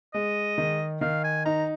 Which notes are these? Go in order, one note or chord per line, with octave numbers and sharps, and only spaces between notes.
G#3 D#5
D#3
D#3 F5
G#5
D#4 A#5